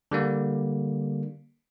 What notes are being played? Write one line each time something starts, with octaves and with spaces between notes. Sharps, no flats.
D3 G3 A#3